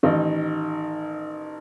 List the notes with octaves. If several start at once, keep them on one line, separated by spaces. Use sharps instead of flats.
A1 D#3 D#4